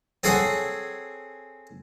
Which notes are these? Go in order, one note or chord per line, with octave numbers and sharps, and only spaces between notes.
C4 G#4 A4 C#5 F#5 G#5